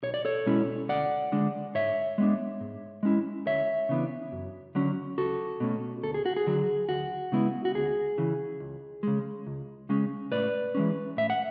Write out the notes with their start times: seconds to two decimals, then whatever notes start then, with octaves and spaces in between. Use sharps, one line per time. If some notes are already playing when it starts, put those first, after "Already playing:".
0.03 B1 C#5
0.14 D5
0.25 A4 C#5
0.46 B2 G#3 C#4 E4
0.89 D2 D5 F#5
1.32 D3 G#3 D4
1.75 G#2 C#5 E5
2.18 G#3 B3 D4
2.61 G#2
3.03 G#3 C#4 E4
3.46 D2 C#5 E5
3.89 C#3 E3 B3 D4
4.32 F#2
4.75 D3 F#3 C#4
5.18 C#2 F#4 A4
5.60 B2 A3 C#4
6.03 D2 A4
6.14 G#4
6.26 F#4
6.37 G#4
6.47 D3 F#3
6.89 D2 F#4
7.32 C#3 G#3 B3 E4
7.65 F#4
7.75 D2 G#4
8.18 C#3 E3
8.60 C#2
9.03 C#3 G#3
9.47 C#2
9.89 C#3 G#3 C#4
10.32 A2 B4 D5
10.75 E3 G#3 C#4
11.17 A2 E5
11.30 F#5